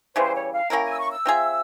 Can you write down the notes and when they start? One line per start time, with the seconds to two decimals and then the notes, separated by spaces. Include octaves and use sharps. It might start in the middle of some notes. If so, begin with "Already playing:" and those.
0.15 C#3 E3 G3 C5
0.34 C#5
0.52 F5
0.70 A#3 C#4 E4 A#4 G5
0.84 G#5
0.92 E6
0.99 C#6
1.11 E6
1.26 C4 F4 G#4 E5